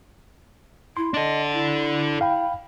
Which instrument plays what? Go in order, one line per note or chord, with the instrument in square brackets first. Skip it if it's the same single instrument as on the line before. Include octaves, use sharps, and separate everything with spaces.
[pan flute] E4 [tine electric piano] C6
[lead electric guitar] D4 A4 [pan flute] D#5
[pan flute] E4
[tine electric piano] F5 G5 B5